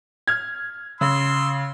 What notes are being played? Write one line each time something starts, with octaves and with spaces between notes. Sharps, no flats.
F6 G#6
C#3 C6 E6